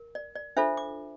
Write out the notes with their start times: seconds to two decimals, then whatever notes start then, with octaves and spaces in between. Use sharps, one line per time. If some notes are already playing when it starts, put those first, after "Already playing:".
Already playing: A#4
0.15 D5
0.36 D5
0.57 D4 F4 A4 C5 E5
0.77 D6